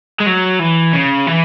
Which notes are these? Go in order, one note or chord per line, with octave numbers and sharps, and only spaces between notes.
G#3
F#3
E3
C#3
E3